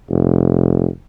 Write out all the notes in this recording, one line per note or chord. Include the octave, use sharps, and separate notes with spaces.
F1